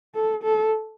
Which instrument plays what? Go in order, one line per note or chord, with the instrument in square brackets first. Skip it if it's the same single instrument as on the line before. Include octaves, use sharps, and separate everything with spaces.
[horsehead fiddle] A4
A4